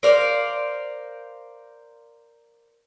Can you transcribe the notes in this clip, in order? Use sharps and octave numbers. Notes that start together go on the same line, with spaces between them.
A#4 C5 D5 F5